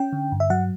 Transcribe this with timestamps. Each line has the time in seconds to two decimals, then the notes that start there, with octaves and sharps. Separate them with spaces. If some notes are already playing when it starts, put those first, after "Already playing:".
Already playing: C#4 G5
0.13 D3
0.32 G2
0.40 E5
0.50 F#3 F#5